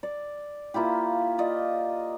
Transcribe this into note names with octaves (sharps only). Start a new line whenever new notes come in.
D5
A#3 E4 F4 G4
F4 D5 D#5